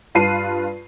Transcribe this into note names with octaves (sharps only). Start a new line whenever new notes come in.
G2 F4 B4 A5 C7 D#7